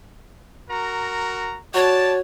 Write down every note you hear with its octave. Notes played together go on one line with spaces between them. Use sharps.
F#4 A#4 A#5
F#4 C#5 D5 A5